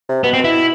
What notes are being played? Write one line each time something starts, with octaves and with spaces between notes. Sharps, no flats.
C3
B2 B3
C4
B2
E4